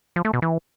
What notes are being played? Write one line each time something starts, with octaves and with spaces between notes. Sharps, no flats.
F3
A3
B2
E3